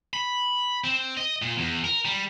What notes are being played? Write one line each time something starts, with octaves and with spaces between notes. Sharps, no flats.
B5
C4
D#5
A#2
E2
A#4
G3